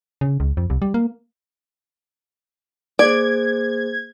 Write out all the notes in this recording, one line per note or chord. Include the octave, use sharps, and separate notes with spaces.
C#3
C#2
F2
C2
G3
A#3
A#3 G#4 C5 D5 G#6